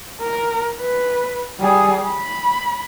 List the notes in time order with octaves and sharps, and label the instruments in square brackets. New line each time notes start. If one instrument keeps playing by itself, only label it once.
[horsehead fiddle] A#4
B4
G3 G#4
B5